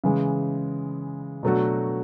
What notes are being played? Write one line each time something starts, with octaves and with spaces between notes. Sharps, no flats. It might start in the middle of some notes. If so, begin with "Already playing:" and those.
C#3 E3 G#3
B2 F#3 A3 D4 F#4